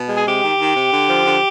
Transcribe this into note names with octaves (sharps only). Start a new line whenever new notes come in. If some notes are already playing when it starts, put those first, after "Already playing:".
Already playing: B2
G#3
G#4
C3 G4
D#3
D#3
C3
D3
F3
D3